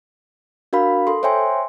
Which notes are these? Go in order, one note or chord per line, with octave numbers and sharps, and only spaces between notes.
D4 F#4 A#4 F5 B5
A4 C6
C5 C#5 E5 G5 G#5 C6